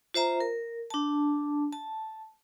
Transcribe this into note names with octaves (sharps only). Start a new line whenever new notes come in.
F4 C5 E5 A#5
A#4
D4 A5
A5